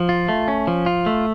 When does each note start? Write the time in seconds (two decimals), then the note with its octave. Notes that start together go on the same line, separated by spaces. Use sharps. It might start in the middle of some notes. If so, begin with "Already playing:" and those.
Already playing: F3
0.09 F4
0.28 A3
0.48 C#4
0.67 F3
0.86 F4
1.06 A3